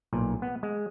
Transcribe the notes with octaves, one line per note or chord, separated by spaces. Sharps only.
B1 A#2
B3
G#3